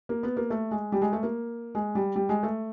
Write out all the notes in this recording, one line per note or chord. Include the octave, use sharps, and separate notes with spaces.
A#3
B3
A#3
A3
G#3
G3
G#3
A3
A#3
G#3
G3
G3
G#3
A3